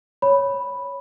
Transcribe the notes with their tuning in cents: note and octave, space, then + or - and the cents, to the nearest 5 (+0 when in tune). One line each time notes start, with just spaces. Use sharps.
C#5 +0 B5 +0